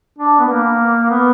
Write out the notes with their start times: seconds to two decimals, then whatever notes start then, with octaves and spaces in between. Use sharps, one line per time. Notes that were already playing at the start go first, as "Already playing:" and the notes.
0.19 D4
0.40 B3
0.49 A#3
1.10 B3